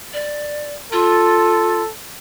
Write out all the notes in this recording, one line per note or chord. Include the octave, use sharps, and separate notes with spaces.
D5
F4 A4